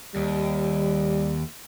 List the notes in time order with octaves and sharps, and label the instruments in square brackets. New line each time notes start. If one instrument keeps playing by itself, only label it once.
[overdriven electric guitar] D#2 [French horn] G3